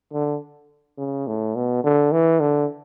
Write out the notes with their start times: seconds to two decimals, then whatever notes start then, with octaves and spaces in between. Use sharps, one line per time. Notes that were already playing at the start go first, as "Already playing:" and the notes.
0.13 D3
0.98 C#3
1.27 A2
1.55 B2
1.84 D3
2.12 E3
2.40 D3